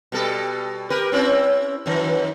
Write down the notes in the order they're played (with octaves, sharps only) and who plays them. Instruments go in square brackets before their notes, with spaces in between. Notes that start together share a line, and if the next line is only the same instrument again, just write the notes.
[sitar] B2 G3 A4
G4 A#4 B4
C4 C#4 E4
F#2 D#3